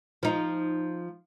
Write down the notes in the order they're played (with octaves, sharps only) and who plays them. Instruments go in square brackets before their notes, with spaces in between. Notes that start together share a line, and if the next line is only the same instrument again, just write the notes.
[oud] F3 D#4